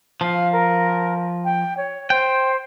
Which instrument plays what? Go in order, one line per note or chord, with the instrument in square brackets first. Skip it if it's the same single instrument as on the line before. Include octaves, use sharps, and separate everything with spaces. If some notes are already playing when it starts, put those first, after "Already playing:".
[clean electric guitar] F3 [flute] F5
[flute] A#4
G5
C#5
[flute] C5 [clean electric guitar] G5